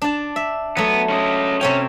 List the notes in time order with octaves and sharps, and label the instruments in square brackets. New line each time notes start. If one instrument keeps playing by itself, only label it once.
[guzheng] D4 A5
E5
[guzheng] F#3 A3 [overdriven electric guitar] B3
[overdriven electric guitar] C#4 D#5
[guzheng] C3 C#5 G5 [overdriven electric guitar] C#4